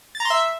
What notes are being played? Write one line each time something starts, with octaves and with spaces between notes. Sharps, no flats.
A6
A#5
C6
E5